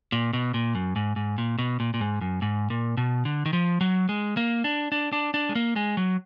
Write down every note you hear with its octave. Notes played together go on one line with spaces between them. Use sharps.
A#2
B2
A#2
F#2
G#2
G#2
A#2
B2
A#2
A#2
G#2
F#2
G#2
A#2
B2
D3
D#3
F3
F#3
G#3
A#3
D4
D4
D4
D4
G#3
A#3
G#3
F#3